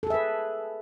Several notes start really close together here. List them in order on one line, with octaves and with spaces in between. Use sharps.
A4 G#4 E5 B4